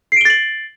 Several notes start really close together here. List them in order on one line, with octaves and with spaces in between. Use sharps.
C7 D7 G7 A6 F#7